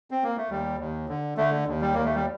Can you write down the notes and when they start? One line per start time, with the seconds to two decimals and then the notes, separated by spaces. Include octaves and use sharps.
0.11 C4
0.24 A#3
0.37 A3
0.50 D#2 G3
0.79 D#2
1.09 D3
1.37 D3 A3
1.67 D#2
1.82 G3
1.94 D#2 A#3
2.05 A3
2.15 G3